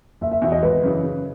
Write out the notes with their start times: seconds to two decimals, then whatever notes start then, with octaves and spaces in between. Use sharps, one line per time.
0.21 F#1 E5
0.31 E5
0.42 E2 B2 E5
0.52 D#5
0.63 G#1 B4
0.84 F#2 C#3 E3
1.04 C#3